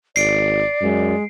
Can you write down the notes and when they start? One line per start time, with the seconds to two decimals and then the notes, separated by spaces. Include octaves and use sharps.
0.16 G#1 D5 C7 D7
0.81 F#2 G#3